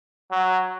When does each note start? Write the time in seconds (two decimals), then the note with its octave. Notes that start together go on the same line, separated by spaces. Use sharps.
0.31 F#3